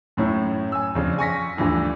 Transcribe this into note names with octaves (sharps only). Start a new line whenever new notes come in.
F#2 A2 C#4 E4
G#5 E6
F2 C#3 D4
G#5 C#6 A#6 B6
D2 G2 D3 E3 F3